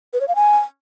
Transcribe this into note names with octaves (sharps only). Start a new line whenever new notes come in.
B4
C#5
F5
G#5